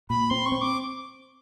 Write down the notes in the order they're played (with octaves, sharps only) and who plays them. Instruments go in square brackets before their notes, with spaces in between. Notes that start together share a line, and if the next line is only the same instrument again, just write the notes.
[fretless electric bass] A#2 [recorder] B5
[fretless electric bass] C4 [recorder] C6
[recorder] C#6
[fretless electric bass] C4
[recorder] D6